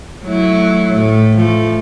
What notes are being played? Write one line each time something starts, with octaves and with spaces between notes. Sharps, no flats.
F#3 A3 E4
A2 A3
F3 A3